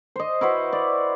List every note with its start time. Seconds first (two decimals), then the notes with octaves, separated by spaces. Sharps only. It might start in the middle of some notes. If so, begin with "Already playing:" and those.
0.16 C5 D#5
0.41 E4 F#4 B4 C5
0.73 D5